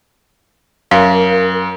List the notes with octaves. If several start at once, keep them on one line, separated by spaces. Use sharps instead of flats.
F#2 A#4 F5